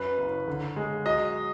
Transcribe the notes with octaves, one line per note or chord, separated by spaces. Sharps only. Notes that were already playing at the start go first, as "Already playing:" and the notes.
Already playing: F#2 B4
F#1
D3
G#3
F#3 D#5